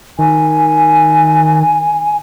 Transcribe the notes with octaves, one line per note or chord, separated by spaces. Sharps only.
D#3 G#5